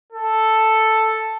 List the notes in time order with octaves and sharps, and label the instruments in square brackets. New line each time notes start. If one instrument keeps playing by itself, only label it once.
[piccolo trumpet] A4